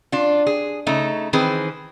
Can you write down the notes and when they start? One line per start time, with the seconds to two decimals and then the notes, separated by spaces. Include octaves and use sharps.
0.12 D4 F4
0.47 G#4
0.87 C#3 A3 D#4
1.33 D#3 E3 C4 G#4 B4